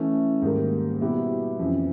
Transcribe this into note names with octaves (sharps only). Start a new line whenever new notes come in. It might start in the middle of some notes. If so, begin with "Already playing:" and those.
Already playing: E3 A3 C#4
G#2 D#3 G3 A#3
B2 G3 B3 E4 G4
F2 C#3 E3